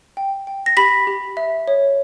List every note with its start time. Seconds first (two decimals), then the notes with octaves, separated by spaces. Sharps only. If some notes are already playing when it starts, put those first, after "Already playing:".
0.17 G5
0.47 G5
0.66 A#6
0.77 G4 B5 B6
1.07 G4
1.37 E5
1.68 C#5